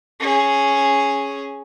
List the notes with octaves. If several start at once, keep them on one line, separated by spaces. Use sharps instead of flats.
C#4 G#4